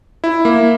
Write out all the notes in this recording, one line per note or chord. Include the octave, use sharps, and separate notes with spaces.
E4
A#3